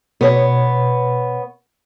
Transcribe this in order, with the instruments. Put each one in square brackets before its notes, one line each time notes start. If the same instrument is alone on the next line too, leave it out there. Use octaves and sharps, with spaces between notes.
[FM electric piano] B2 [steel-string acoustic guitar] B3 C#5